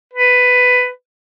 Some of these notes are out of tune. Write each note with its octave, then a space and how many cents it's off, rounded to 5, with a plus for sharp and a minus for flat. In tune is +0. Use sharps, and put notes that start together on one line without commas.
B4 +10